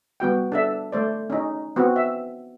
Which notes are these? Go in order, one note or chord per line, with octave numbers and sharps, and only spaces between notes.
G3 B3 F#4 G5
D4 A4 E5
A3 C5 D5
C#4 D#4
B3 C4 F#4
E5